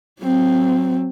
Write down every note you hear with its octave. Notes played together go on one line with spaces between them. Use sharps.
F#3 C4